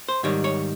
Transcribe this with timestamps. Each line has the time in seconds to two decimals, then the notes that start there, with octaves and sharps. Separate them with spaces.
0.09 C5
0.23 G#2 D#3 G3 C#5
0.44 C#5